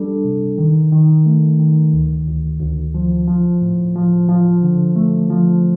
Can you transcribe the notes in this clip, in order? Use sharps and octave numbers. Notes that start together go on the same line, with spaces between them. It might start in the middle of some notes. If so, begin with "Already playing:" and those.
Already playing: G3 D4 A4
C3
D#3
D#3
A3
D#3
D2
D2
D2
F3
F3
A2
F3
F3
D3
A3
F3